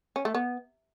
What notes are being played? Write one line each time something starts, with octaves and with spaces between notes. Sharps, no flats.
C#4
A3
B3